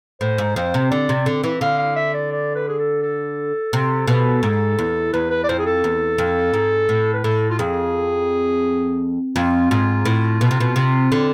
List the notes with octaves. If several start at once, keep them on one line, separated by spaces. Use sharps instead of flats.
A2 C5
G#2
F2 C5
C3
D3 D5
C3
D3
E3
D3 F5
F5
E5
D5
D5
B4
G#4
A4
A4
C3
B2
G#2
E2
E2 B4
B4
D5
F2 C5
G#4
A4
E2
F2
G#2
A2
B4
A2 A4
F4
F2 G#4
F2 F4
G#2 F4
A2
B2
C3
B2
C3
D3